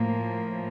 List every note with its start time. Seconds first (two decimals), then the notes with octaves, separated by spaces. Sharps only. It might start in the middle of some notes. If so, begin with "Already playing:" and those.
Already playing: A2 F3 A#3